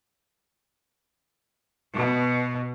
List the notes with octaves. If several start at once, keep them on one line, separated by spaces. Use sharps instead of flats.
B2